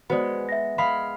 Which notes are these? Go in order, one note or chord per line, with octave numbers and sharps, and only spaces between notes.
G#3 B3 F#4 C5 D5
E5 A#6
G#3 F5 B5